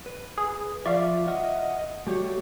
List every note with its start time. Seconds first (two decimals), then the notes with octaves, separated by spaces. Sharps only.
0.06 B4
0.38 G#4
0.86 F3 F4 D5 E5 F5 C#6 D6
1.28 D#5 E5 F#5 F6
2.07 G3 A3 F#4 G4 C#5